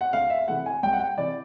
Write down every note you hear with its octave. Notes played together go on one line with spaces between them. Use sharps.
F#5
D2 F5
E5
C3 E3 A3 F#5
G#5
C2 G5
F#5
G5
C3 E3 D5